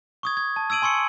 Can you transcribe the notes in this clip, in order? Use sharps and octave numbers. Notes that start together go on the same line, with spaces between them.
C#6 D#6 G#6
G#6
A5
E6 G#6 D7 D#7 F#7
G#5 C6 C#6 E6 C#7